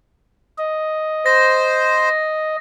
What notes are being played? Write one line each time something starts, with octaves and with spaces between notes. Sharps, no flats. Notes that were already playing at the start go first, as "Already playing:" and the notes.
D#5
C5 A#6